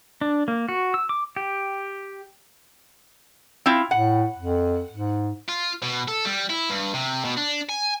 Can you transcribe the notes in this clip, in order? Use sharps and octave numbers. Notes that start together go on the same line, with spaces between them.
D4
A#3
F#4
E6
D6
G4
C4 E4 F4
A2 F#5
F2
G#2
F4
B2
A4
G3
E4
G2
C3
B2
D4
G#5